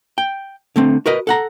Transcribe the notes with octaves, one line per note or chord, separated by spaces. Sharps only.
G5
D3 A3 C4
F#4 A#4 B4 D#5
A4 F#5 A#5